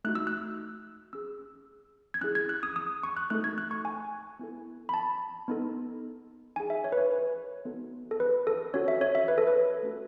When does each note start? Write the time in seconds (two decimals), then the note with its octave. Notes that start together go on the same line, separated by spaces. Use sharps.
0.05 A3 D#4 F#4 F#6
0.15 E6
0.27 F#6
1.13 C#4 G#4 E6
2.14 G#6
2.21 C#4 E4 G#4 F#6
2.35 G#6
2.49 F#6
2.63 D#6
2.76 D#6
3.03 C#6
3.17 F#6
3.30 A3 D#4 F#4 A4 F#6
3.44 G#6
3.58 F#6
3.71 C#6
3.85 G#5
4.39 B3 E4 A4
4.89 B5
4.94 A5
5.48 B3 D#4 A4
6.56 D#4 G#4 G#5
6.70 E5
6.84 C#5
6.92 B4
6.98 C#5
7.11 B4
7.65 B3 D#4 F#4 A4
8.11 A4
8.20 B4
8.47 A4
8.74 C#4 F#4 A4 C#5
8.88 E5
9.01 C#5
9.15 E5
9.28 B4
9.38 A4
9.47 B4
9.83 A3 C#4 F#4 A4